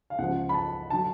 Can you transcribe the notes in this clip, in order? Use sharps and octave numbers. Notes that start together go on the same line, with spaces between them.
F5
C#2 C#3 F3 F#5
B5
A5
D3 F#3 A5